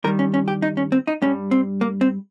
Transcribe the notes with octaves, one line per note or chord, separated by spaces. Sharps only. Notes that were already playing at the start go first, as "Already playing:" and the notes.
G2 D#3 G3 A#4
C#4
C#4
G4
D#4
C#4
C4
D#4
G2 G3 C#4
C4
A#3
C4